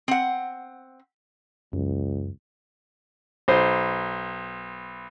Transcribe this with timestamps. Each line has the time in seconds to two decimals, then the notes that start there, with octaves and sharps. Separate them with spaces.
0.08 C4 F#5
1.73 C#2 F#2
3.48 B1 C5